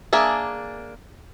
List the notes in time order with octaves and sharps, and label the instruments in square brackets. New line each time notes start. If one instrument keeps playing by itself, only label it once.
[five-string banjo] A#3 D4 G#4 E5